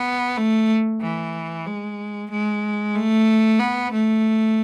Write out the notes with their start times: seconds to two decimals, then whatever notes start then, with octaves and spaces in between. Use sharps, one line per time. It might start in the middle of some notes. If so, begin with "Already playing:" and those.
Already playing: B3
0.37 A3
1.01 E3
1.67 G#3
2.31 G#3
2.95 A3
3.60 B3
3.93 A3